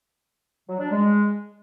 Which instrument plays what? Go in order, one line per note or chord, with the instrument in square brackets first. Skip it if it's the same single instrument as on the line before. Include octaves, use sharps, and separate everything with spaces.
[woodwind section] F#3
D4
G#3